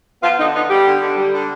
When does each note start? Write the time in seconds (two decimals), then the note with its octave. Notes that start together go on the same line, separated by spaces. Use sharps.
0.23 F3 B3 F4
0.39 D3 D#4
0.54 B3 D#4
0.69 G3 B3 G4
0.86 D3
1.01 D3
1.17 G3
1.33 D3